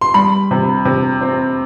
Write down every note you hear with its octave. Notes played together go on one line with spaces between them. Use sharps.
C6
G3 B5
C3
C3
C4